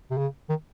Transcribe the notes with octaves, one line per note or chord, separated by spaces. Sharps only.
C3
C#3
D#3